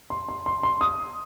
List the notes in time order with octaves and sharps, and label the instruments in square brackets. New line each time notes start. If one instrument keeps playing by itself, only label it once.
[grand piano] C6
C6
C6
C6
D#6